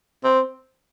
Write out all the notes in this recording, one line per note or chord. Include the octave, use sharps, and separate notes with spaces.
C4